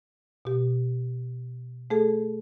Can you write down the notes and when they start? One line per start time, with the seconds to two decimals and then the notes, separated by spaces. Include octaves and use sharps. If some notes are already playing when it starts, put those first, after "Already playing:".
0.45 B2 G4
1.90 A3 G#4 A4